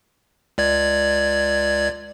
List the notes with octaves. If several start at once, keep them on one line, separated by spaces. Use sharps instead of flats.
C#2 D5 G#6